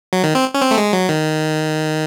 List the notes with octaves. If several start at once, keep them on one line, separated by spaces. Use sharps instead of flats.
F#3
D#3
C4
C#4
C4
A3
G#3
F#3
D#3